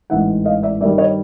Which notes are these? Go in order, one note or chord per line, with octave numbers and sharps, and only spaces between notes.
A1 G#2 E3 E5 F#5
D#5 F5
D5 E5
G2 D#3 G3 D5 E5
C#5 D#5